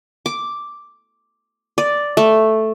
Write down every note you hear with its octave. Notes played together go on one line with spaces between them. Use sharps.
D6
D5
A3